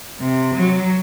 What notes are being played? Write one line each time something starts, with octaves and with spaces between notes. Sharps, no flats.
C3
F#3